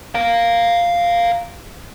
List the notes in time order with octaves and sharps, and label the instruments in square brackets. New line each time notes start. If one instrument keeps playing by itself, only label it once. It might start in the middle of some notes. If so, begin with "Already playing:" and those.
[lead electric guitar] F5 A#5